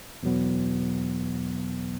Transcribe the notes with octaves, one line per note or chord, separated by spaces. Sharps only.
E2 B2 F#3 B3